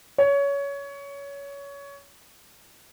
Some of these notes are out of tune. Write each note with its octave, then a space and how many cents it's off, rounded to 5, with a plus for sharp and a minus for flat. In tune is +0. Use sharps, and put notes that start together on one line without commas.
C#5 +20